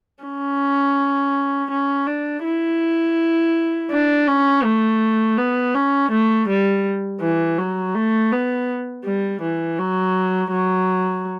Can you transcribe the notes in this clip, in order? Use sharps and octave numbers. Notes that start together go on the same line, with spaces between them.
C#4
C#4
D4
E4
D4
C#4
A3
B3
C#4
A3
G3
E3
F#3
A3
B3
G3
E3
F#3
F#3